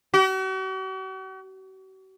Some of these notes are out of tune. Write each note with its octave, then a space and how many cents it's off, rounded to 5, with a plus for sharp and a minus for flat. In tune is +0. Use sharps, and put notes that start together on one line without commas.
F#4 +45